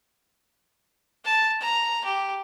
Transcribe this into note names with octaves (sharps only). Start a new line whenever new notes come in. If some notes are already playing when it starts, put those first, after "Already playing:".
A5
A#5
G4